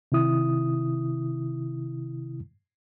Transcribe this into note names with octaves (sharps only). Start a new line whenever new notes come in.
C3 D#3 E4 D#6